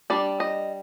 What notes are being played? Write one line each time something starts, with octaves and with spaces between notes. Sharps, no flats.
G3 D4 D5
D#5